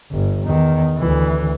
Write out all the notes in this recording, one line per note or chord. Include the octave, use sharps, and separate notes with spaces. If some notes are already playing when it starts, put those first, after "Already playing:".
G1
E2 D#3
D2 E3